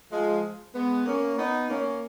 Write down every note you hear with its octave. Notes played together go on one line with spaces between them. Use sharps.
F3 G#3
G#3 B3
A#3 C#4
B3 D#4
A#3 C#4